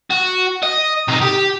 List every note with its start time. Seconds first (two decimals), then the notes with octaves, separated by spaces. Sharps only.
0.10 F#4
0.63 D#5
1.08 C3 D#3
1.21 G4